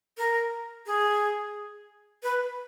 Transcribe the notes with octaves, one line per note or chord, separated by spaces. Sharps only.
A#4
G#4
B4